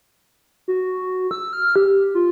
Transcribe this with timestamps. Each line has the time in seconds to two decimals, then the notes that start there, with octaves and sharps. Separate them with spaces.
0.68 F#4
1.31 E6
1.53 F6
1.76 G4
2.14 F4